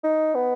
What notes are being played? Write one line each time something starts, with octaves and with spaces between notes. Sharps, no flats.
D#4
B3